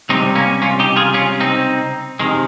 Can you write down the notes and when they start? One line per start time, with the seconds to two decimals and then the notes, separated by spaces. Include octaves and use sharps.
0.09 C#2 C3 G3 C4 D#4
0.35 A#3 C#4
0.62 C#4 F4
0.80 D#4 G4
0.96 F4 G#4
1.14 C#4 F4
1.40 C4 D#4
2.20 C3 D#3 G#3